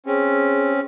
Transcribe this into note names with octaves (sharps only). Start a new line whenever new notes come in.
C4 C#4 G#4